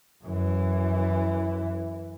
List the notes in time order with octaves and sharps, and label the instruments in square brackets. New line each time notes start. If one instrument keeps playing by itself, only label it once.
[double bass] F#2 E3